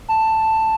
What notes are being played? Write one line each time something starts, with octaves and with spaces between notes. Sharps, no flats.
A5